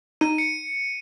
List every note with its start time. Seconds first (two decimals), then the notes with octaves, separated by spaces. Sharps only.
0.21 D#4 D#7
0.38 C#7